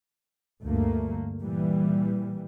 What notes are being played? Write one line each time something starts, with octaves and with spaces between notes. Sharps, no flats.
D2 G2 A3 A#3
A#2 E3 G3